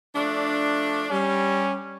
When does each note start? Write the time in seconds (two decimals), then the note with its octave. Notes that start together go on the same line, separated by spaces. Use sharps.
0.15 F3 A3 D4
1.11 G3 C#4